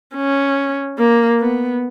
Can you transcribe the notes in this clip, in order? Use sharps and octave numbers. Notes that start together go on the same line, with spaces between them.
C#4
A#3
B3